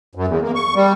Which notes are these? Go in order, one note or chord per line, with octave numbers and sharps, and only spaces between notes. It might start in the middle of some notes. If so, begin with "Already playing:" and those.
F#2
E2
A#3
C#6
G3